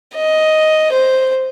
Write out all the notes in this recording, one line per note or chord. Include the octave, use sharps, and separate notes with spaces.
D#5
C5